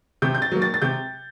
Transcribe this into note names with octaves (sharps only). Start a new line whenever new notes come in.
C3 G6
G6
A6
F#3 A#3
A6
A6
C3 G6